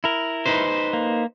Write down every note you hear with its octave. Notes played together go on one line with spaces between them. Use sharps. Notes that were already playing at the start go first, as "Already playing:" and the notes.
E4 A#4
D#4 B4 C5
A#3